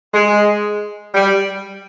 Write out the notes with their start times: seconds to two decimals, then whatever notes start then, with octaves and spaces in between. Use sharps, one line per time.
0.13 G#3
1.14 G3